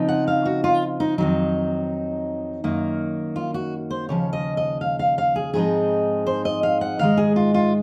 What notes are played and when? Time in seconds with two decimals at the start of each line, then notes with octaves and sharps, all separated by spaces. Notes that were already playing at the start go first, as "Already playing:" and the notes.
Already playing: C#3 F3 C4 D#4
0.09 F#5
0.28 F5
0.46 F#4
0.64 F4
1.00 D#4
1.18 F2 D#3 F#3 D#4
2.64 F#2 D#3 A#3
3.36 F4
3.54 F#4
3.91 C5
4.09 D#2 C#3 F3 C#5
4.33 D#5
4.57 D#5
4.81 F5
4.99 F5
5.18 F5
5.36 G#4
5.54 G#2 F3 G#3 C4 D#4 G#4
6.26 C5
6.45 D#5
6.63 F5
6.81 F#5
6.99 G#2 D#3 G#3 F5
7.17 G#4
7.36 F4
7.54 F4